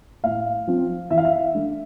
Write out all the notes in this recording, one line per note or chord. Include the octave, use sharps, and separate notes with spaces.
A2 F5
F3 C4
E3 E5
F5
E5
A3 D4